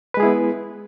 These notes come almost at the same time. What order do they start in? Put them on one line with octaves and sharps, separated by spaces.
B4 G#3 G#4 E4 B3